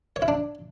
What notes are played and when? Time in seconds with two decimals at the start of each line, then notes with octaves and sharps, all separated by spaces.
0.16 C#5
0.22 E4
0.28 D4